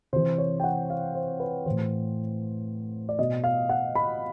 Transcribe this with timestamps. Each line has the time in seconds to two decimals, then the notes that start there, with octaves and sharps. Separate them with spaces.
0.13 C3 E3 C5
0.38 C#5
0.60 G5
0.64 F#5
0.90 F5
1.15 C5
1.40 B4
1.66 A2 E3 C5
3.09 D5
3.19 B2 D#5
3.44 F5
3.69 F#5
3.95 B5